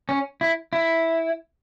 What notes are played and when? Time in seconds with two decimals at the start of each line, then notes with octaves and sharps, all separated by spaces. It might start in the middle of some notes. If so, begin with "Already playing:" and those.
0.09 C#4
0.41 E4
0.73 E4